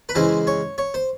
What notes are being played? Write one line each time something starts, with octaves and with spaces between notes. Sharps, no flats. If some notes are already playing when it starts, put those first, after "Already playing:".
B4
C#3 E3 G#3 C5
C#5
C#5
C5